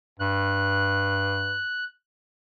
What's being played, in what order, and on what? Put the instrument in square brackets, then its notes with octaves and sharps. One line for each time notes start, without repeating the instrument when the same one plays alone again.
[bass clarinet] G2 [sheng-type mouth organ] F#6